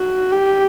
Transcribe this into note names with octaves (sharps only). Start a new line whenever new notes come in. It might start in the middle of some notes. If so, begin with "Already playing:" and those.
Already playing: F#4
G4